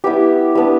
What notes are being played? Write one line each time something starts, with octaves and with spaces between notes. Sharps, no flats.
G3 B3 E4 G4
G3 B3 D4